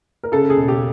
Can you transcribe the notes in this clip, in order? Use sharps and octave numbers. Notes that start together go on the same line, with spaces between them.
A#4
C#3 A4
G#4
E1
G4